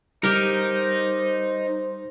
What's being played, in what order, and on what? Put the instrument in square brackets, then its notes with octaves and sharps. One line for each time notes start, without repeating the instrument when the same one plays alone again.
[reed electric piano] G3 [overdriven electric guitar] D#4 [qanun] G4 A#4 [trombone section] C5